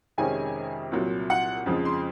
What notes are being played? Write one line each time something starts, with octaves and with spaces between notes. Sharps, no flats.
F2 C3 D#3 G#3 C#4 G#5
C2 A#2 F#3
F#5
F2 C#3 F3 G#3
C6